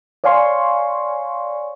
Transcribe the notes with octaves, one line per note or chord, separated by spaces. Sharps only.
C#5 D5 F5 G#5 C6 C#6